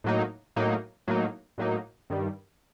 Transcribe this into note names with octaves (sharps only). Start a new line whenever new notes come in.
A2 F#3 A#3 D#4
A2 F#3 A#3 D#4
A2 F#3 A#3 D#4
A2 F#3 A#3 D#4
G2 D#3 G3